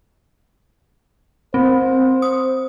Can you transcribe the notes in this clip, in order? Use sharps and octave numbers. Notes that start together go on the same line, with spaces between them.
C4 C5
D#6